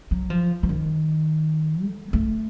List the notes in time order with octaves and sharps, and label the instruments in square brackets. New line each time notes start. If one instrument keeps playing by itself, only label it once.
[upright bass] F#3
F3
E3
D#3
A3
A3